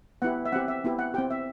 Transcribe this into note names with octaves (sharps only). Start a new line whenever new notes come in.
B3 E4 G4 F#5
E5
C4 G4 F#5
E5
B3 E4 G4
F#5
C4 G4 G5
E5